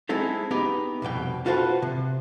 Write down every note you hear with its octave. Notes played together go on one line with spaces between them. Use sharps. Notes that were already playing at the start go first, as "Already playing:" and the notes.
G#3 C4 D#4 E4 A4
B3 D#4 G4
C2 F2 B2 G5
F4 F#4 A4 B4 C5 G5
C3